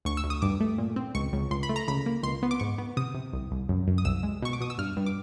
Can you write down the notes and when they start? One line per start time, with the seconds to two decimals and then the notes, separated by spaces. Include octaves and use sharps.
0.05 D2 C#6
0.17 E6
0.24 D2
0.30 D#6
0.42 G2 D6
0.60 A3
0.78 A#2
0.96 C4
1.15 C#2 C#6
1.33 C#2
1.51 C#2 C6
1.63 B5
1.69 A3
1.76 A#5
1.88 C#2 B5
2.06 A#3
2.23 C#2 C6
2.43 B3
2.51 D6
2.60 G#2 C#6
2.78 B3
2.97 C3 D#6
3.15 C3
3.33 C2
3.51 C2
3.69 F#2
3.88 F#2
3.98 D#6
4.05 C2 E6
4.23 G#3
4.42 B2 C#6
4.53 D6
4.61 B2 D#6
4.70 E6
4.78 G2 F6
4.97 G2
5.06 D6